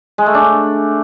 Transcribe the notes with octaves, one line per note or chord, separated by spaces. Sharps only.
G#3
A3
D4